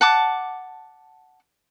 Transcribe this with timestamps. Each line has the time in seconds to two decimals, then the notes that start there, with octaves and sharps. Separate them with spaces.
0.01 F#5 A5 D6